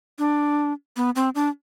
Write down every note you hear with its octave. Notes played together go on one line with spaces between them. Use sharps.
D4
B3
C4
D4